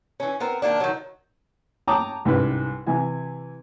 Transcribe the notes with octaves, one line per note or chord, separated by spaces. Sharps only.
E3 C#4
B3 C4 A#4
D#3 A#3 D4
D#3 F#3
C#5 G5 A5 A#5 D6 D#6
C2 G#2 G3 C#4 B4
C3 E3 G#5